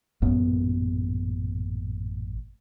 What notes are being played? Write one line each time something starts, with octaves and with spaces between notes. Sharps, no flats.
A1 F#2 A#2 B3